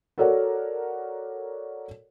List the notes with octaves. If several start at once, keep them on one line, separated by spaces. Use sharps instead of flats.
F#4 A4 A#4 C#5 D5 F#5